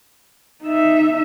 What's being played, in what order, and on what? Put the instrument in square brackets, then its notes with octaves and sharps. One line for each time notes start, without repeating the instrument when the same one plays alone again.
[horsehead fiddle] D#4 E5